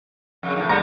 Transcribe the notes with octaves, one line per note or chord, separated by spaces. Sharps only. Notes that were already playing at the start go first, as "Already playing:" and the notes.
F2 C#3
E2 A2 D#3
D3 G3 B3 A#5